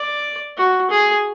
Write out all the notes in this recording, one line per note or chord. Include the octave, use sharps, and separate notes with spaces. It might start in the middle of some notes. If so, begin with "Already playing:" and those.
Already playing: D5
F#4
G#4